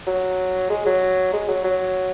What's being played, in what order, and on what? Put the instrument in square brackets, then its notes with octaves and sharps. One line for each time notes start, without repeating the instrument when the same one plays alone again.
[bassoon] F#3
G#3
F#3
G#3
F#3
F#3